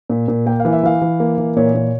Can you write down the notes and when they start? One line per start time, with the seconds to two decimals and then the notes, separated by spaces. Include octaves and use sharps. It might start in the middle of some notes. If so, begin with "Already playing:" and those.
0.10 A#2
0.28 A#2
0.46 A#3 G5
0.60 F5
0.65 E3
0.73 E5
0.83 E3 F5
1.02 E3
1.20 A#3
1.38 E3
1.56 A#2 C#5
1.75 A#2